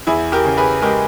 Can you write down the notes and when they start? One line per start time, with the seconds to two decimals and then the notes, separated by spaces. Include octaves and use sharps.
0.07 E2 E4 G#4
0.32 G4 A#4
0.45 C#3
0.57 G#4 B4
0.82 G#3 G4 A#4